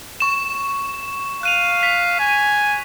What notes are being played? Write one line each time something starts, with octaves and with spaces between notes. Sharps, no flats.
C#6 E7
F5 F#6 D#7 F7
B6
G#5